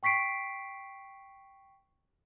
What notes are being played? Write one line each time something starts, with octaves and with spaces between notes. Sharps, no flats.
G5 C#6 B6 C7 D7